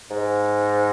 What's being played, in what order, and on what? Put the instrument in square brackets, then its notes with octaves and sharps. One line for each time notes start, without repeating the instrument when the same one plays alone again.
[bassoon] G#2